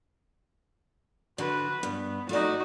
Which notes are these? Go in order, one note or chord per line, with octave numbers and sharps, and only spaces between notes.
D3 F3 F#4 B4
G2 B3
A3 D#4 F#4 D5